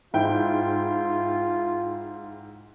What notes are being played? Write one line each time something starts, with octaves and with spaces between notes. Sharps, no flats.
G#2 E4 F4 G5